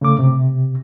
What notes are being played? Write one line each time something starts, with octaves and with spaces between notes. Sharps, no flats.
C#3 A3 D6
C3